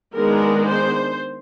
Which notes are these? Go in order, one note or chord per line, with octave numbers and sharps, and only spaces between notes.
D#3 G#3 B3 D4 A#4
C5